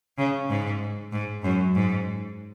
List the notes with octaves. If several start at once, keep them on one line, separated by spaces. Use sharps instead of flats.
C#3
G#2
G#2
F#2
G#2